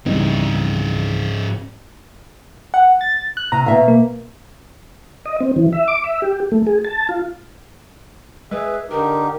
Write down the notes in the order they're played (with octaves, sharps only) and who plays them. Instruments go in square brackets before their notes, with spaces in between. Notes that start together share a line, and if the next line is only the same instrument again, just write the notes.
[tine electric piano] C#2 E3 [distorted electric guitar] G#2 C#3 [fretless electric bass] G3 B3 C4 [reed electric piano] D#4
[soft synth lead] F#5
A6
F#6
[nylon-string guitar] C3 [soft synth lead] A#5
[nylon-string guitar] B2 E5 F5
[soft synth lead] A#3
[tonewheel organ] D#5
C4
E3
E5
D6
E5
G4
A3
G#4
A5
F4
[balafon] G#3 [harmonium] G#4 E5 [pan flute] B4
[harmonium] D3 D#4 G4 [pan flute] A#4